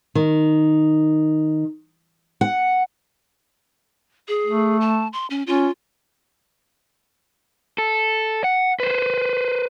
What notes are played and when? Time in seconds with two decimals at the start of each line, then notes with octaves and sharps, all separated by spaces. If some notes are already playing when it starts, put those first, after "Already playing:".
0.15 D#3
2.41 F#5
4.28 G#4
4.47 A3
4.81 A5
5.13 C6
5.30 C#4
5.47 C#4 F4
7.78 A4
8.44 F#5
8.80 B4 C5